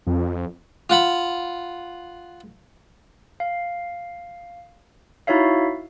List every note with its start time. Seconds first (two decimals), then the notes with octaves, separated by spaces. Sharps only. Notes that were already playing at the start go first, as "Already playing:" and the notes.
0.07 F2
0.90 F4 F#5 B5
3.40 F5
5.27 D#4 E4 F#4 C#5 E5 F5